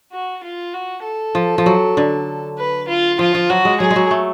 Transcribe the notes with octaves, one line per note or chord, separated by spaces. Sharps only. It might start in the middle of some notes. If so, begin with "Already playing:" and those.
F#4
F4
F#4
A4
F3
F3
F#3
D3
B4
F4
F3 F4
F3
F#3 F#4
G#3
F#3 G#4
G#3
F#3
A3